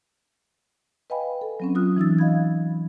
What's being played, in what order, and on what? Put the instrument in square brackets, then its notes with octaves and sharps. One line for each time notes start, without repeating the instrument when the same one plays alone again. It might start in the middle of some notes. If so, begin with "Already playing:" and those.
[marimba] B4 D#5 F5 G5 G#5 B5
A4
F#3 C4 C#4
F#3 F4 D#6 F6 F#6
E3 D#4 E6 A6
D#5 F5 B5 G#6